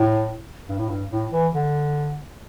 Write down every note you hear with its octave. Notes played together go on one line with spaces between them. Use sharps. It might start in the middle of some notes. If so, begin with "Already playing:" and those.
Already playing: A2
G2
A2
G2
A2
E3
D3